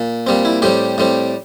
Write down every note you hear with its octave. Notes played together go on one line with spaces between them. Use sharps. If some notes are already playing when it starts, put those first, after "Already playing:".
Already playing: A#2
A#2 G3 C4
E4
A2 G3 C4 G4
A2 G3 C4